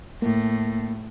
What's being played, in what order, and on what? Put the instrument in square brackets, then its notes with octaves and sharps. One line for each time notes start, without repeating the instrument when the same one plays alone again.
[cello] A2 [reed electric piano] A#3